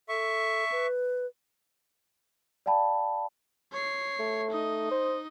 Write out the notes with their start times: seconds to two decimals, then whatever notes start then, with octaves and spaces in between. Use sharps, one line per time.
0.09 A4 E5 C#6
0.72 B4
2.66 D5 F5 G5 A5 B5
3.72 C#5 C7
4.19 A3
4.51 D#4 D#5
4.91 C5